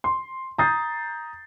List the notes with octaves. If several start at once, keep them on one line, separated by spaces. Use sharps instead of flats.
C6
A#5 D#6 G6 A6 C7